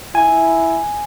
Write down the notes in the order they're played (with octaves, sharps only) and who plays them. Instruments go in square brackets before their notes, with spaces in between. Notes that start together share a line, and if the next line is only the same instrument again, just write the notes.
[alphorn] E4 [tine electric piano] G#5